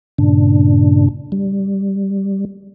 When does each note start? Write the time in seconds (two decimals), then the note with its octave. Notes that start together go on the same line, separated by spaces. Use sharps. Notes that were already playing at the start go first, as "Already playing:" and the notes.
0.18 G2 A#2 C#3 D4
1.32 G3